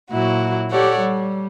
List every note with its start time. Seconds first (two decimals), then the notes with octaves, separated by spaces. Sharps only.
0.11 A#2 F#3 E4 F#4
0.70 G4 A4 C#5 D5 F#5
0.99 G3